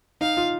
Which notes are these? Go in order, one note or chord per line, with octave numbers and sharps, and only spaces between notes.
D#4 F5
F4